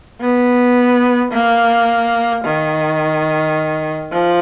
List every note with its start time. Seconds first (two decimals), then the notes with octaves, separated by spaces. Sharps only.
0.21 B3
1.32 A#3
2.44 D#3
4.11 F3